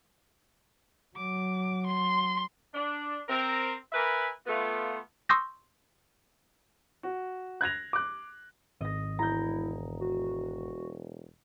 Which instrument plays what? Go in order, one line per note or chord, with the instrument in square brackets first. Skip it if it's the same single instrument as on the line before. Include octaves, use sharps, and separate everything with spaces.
[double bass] F#3 [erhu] D6
[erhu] C6
[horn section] D4
C4 A#4
A#4 B4 E5 G#5 B5
A3 B3 F4
[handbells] C6 C#6 D#6 E6 G6 A#6
[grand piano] F#4
F#6 G#6 A#6 F7
D6 F#6
[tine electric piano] G#1 [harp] D#5 A#6
[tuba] E1 [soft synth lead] E4 [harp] A#5 G6
[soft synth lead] F#4